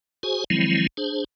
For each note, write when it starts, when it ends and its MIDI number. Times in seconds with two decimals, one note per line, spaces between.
0.23 0.44 66
0.23 0.44 68
0.23 0.44 72
0.23 0.44 80
0.50 0.87 51
0.50 0.87 53
0.50 0.87 54
0.50 0.87 56
0.50 0.87 60
0.50 0.87 64
0.97 1.24 62
0.97 1.24 68
0.97 1.24 72